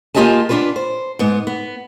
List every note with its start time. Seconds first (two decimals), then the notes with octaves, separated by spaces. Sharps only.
0.14 A#3 F4 G4 D#5 G#5 A5
0.49 B3 D4 F4 G4 B4
0.76 C5
1.19 G#2 B3
1.47 B3